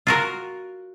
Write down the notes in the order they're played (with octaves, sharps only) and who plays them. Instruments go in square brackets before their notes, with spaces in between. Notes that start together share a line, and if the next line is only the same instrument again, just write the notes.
[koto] F4 F#4 A#4